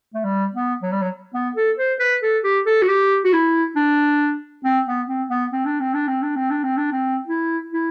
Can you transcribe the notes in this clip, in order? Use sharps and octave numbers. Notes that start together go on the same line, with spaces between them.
A3
G3
B3
F#3
G3
F#3
B3
A4
C5
B4
A4
G4
A4
F#4
G4
F#4
E4
D4
C4
B3
C4
B3
C4
D4
C4
D4
C4
D4
C4
D4
C4
D4
C4
E4
E4